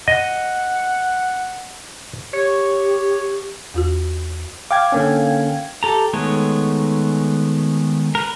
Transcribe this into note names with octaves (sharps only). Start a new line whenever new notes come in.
D#5 F#5
G4 C#5
E2 F4 F#4
F5 G5 D6 G#6
D3 A#3 C#4
G4 A4 A#5
D#3 G#3 A3 B3 C#5
A#4 B4